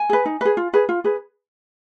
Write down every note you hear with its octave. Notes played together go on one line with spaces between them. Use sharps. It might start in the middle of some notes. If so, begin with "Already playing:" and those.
Already playing: G#5
G#4 B4
D#4
G#4 B4
F4
G#4 B4
F4
G#4 B4